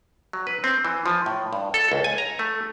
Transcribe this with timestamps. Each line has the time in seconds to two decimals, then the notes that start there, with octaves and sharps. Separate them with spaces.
0.33 F#3
0.47 B4
0.64 C4
0.85 E3
1.06 F3
1.26 A2
1.53 G2
1.74 A4
1.92 C#2
2.04 G#5
2.18 A#5
2.39 A3